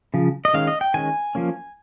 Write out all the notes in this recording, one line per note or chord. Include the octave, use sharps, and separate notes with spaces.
C#3 F3
D#5
D#3 G#3 C#4 F5
D#5
G5
D#3 G#3 C#4 G#5
F3 A#3 C#4